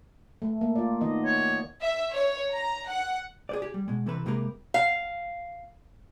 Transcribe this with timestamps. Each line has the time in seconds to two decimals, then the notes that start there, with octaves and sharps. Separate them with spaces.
0.42 A3
0.61 A#3
0.76 F4 D5
1.01 D#3 B3 D#5
1.25 C#5
1.81 E5
2.13 C#5
2.52 A#5
2.89 F#5
3.49 G#4 C5 D5
3.62 G4 G#4
3.74 G3
3.88 B2 G#3
4.06 C3 E3 C4 A4 B4
4.26 C3 G#3 A#3 G4 A#4 B4
4.74 F5